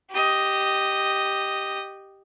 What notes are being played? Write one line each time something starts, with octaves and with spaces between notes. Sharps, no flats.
G4 D#5